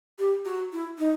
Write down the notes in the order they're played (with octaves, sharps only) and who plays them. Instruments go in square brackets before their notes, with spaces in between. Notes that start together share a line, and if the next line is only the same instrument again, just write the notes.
[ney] G4
F#4
E4
D#4